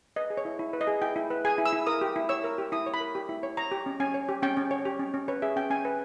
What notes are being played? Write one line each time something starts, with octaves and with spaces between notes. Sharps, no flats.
B4 D#5
G#4
C#5
E4
E4
B4
D#5
G#4
E4 G5
E4
B4
G#4 G#5
E4
E6
E4
A#4 D#6
G4
E4
C#5 E6
A#4
G4
E4 D#6
C#5
B5
A#4
G4
E4
C#5
C#5 A#5
G4
C#4
C#4 G#5
C#5
G4
C#4 G5
C#4
C#5
G4
C#4
C#4
B4 C#5
G#4 E5
C#4 G5
C#4 G#5
B4